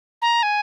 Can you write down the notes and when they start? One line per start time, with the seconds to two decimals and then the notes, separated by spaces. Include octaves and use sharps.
0.22 A#5
0.43 G#5